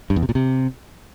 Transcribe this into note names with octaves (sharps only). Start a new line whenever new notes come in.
G2
E2
C3
A#2
C3